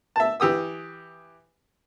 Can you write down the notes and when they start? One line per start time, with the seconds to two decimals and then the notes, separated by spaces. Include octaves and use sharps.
0.16 E5 A5
0.40 E3 G4 D#6 E6